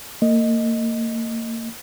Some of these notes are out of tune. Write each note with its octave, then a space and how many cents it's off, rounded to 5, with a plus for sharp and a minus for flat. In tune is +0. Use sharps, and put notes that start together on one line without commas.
A#3 -35 D#5 +0